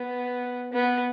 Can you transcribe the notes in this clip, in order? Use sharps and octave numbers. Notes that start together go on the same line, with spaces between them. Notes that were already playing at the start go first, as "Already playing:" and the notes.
Already playing: B3
B3